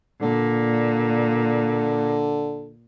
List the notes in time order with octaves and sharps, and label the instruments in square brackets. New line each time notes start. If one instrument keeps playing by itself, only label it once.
[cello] A#2 [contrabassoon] D3